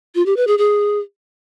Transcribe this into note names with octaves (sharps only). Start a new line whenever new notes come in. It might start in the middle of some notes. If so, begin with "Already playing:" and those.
F4
G4
B4
G#4
G#4